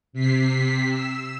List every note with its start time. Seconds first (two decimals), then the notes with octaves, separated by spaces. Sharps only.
0.13 C3 B6 C7
0.88 E6